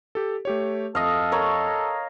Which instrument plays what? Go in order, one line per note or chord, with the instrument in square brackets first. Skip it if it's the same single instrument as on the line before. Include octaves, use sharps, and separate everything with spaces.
[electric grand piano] G4 A4
A3 G4 C#5
[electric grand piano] F2 [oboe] A4 [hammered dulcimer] D#5 F5
[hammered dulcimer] A#4 C#5